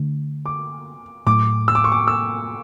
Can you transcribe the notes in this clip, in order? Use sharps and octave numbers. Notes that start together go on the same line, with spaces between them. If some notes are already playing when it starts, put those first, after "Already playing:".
Already playing: D3 A3
D6
A2 F#3 A3 D6
E6
D6
C#6
D6
E6